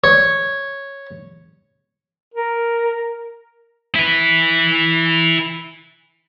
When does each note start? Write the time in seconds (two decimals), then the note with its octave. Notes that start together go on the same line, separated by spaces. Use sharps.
0.04 C#5
2.34 A#4
3.95 E4 B4